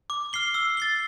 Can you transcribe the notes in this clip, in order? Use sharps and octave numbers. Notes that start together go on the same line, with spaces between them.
D6
F6 C7 G7
E6
A6 C7 G7